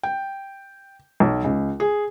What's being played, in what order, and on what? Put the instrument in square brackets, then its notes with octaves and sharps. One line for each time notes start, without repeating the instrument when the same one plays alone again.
[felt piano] G5
B1
C#2
G#4